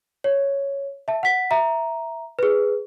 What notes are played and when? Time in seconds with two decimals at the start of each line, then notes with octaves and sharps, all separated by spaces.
0.24 C#5
1.08 E5 A5
1.23 F#5 B6
1.51 E5 A#5
2.39 G#4 B4